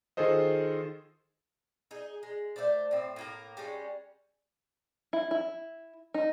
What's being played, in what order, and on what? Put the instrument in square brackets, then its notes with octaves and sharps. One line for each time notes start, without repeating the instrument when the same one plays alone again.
[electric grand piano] D#3 F4 G#4 A4 C5 D#5
[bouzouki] D#4 G#4
G#3
A3 A4 C5 D5
A2 C4
A2 A#3 A#4
G3 G#3 C#4
[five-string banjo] E4
E4
D#4